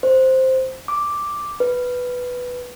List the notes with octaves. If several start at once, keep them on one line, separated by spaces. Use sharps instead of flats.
C5
D6
B4